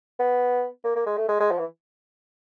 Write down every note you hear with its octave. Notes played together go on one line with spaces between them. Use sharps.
B3
A#3
A#3
G#3
A3
G#3
G#3
F3
E3